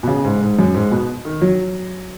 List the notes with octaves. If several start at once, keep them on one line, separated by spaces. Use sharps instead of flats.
B2
C#3
G#2
G#2
F#2
G#2
B2
D#3
F#3